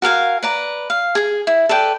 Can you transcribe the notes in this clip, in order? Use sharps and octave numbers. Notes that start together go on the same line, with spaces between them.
F#4 A#4 F5 G#5
B4 D5 A#5
F5
G#4 G#5
E4
A4 B4 D5 G5